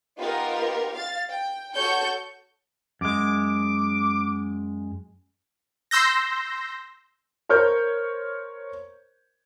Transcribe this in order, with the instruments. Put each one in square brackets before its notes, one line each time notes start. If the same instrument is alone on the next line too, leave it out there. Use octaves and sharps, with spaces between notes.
[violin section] B3 D#4 F4 G4 A#4
F5 A6
G5
F#4 A4 C#5 C#6 G6
[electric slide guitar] F#2 G#3 [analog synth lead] D6
[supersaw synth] C6 E6 G6 A#6
[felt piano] A#4 C5 C#5 F6 G6